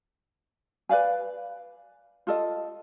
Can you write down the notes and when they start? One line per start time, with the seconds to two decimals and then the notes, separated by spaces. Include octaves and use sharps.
0.89 B4 D5 F5 G#5
2.27 F4 A4 D#5